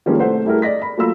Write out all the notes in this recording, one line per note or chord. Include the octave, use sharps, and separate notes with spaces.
D#3 F3 G3 G#3 A#3 C#4
C2 A3 C5 F#5
G3 A3 E4 G#4 A#4
D5 D#5 A#6 B6
B5
F#3 A3 A#3 F4 B5 E6